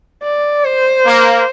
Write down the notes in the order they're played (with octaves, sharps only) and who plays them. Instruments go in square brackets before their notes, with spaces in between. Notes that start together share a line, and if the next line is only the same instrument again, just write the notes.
[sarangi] D5
C5
[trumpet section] A#3